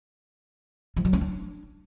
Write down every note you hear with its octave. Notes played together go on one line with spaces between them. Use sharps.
F3
F#3
C#4
D4